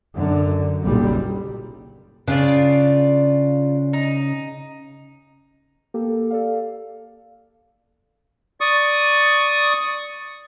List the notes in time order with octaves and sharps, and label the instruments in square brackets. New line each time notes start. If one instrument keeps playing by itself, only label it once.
[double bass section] F#2 D3
F#1 B1 F#2 A#2 G3
[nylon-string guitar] C#3 [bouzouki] D4 F4 D5
[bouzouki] D#4
[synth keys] A#3 G4 A4
A4 D5 F5
[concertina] D5 C#6 D#6